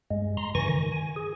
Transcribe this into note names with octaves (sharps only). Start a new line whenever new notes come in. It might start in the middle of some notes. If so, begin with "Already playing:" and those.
G2 G#3
A#5 C6
G2 C#3 E3 G#5 C#6 A#6
D#3
G#5
G#4